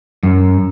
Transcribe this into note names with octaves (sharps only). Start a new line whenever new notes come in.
F#2